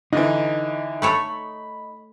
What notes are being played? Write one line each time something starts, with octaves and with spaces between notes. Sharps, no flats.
D3 E3 D#4
A3 A4 C#5 B5